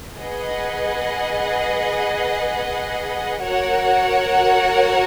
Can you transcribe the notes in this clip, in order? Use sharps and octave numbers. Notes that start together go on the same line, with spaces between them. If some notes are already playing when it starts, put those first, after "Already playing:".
G#4 B4 D#5 F#5
F#4 A#4 C#5 F#5